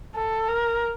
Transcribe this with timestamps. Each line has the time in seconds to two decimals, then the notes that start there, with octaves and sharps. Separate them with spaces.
0.15 A4
0.48 A#4